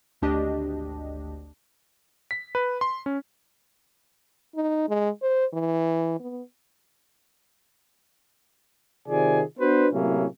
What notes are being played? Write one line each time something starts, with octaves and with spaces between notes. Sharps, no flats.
G#1 D2 D4 G4 D#5
B6
B4
C6
C#4
D#4
G#3
C5
E3
B3
C3 D#3 F4 G#4 D5 G#5
B3 D4 F#4 B4 C5
A2 C3 F#3 A#3 C#4 E4